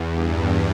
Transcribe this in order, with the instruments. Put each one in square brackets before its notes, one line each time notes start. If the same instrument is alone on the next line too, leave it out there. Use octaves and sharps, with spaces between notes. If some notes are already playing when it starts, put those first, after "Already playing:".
Already playing: [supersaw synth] E2
G2